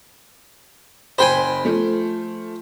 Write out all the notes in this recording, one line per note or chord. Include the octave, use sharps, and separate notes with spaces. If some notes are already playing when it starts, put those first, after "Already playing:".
F#1 C5 G5 G#5 B5
F3 A3